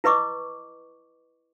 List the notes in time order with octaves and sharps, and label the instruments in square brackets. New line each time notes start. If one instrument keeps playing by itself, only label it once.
[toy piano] E4 B4 D#5 C#6 D6